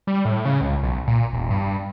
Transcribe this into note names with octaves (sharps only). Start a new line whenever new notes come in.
G3
A2
C#3
C#2
B1
A#2
E1
G2